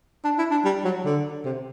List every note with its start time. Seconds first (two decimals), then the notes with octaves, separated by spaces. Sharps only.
0.24 D4
0.38 E4
0.51 D4
0.64 G3
0.84 F#3
1.05 D3
1.45 C3